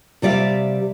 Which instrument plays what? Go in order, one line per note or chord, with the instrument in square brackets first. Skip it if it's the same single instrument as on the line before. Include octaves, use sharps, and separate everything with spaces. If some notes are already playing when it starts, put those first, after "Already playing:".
[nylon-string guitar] C3 G3 D5 E5 F5